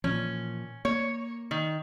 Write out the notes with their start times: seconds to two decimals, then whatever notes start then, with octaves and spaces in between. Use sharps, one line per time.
0.04 A#2 E3 F3 C#4
0.85 A#3 C#5
1.51 D#3